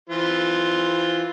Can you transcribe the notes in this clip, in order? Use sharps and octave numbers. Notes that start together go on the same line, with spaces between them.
E3 F4 C5